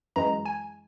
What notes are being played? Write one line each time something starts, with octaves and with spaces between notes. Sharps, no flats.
F#2 E3 G#3 A#5
G#5